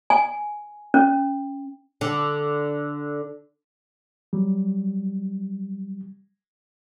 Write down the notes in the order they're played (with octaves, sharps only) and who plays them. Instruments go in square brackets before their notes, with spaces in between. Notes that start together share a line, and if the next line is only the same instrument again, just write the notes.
[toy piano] G#5
C#4
[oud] D3
[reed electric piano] F#3 G3